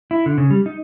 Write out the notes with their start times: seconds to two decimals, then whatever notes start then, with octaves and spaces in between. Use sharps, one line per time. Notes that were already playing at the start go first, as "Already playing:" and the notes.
0.11 E4
0.26 D3
0.38 C#3
0.50 G3
0.66 D#4